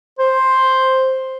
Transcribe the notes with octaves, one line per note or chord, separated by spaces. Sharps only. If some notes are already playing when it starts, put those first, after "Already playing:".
C5